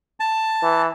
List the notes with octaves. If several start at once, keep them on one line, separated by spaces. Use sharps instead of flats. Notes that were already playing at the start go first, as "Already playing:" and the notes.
A5
E3